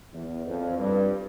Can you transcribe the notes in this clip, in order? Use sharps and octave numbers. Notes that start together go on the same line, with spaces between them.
E2
F2
G2